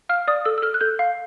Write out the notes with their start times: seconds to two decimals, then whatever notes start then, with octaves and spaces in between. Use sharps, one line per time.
0.09 F5 F6
0.28 D5 D#6
0.45 A4 E6
0.58 E6
0.63 A4 F6
0.74 F#6
0.81 A4 G6
0.99 F5